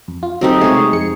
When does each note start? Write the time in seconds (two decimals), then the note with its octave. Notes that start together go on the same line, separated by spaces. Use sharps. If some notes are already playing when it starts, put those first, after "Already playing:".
0.08 F2
0.23 F4
0.41 F#3 C4 D#4 G4 A4
0.61 C3 G#3 A3 G#4 C#5
0.93 F2 G#3 C#7